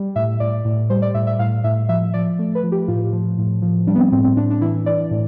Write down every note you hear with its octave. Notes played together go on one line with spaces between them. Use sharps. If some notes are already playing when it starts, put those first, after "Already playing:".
Already playing: G3
A2 E5
A2 D5
A2
G3 C5
D5
A2 E5
E5
A2 F5
A2 E5
F3 E5
F3 D5
A3
B4
F3
G4
A2 F4
F3
A2
F3
G3 D4
B3
C4
A2 C4
C4
A2 D4
D4
E3 E4
E3 D5
A2